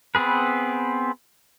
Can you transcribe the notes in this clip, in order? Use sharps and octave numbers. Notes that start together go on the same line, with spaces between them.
B3 C4 G#4 B4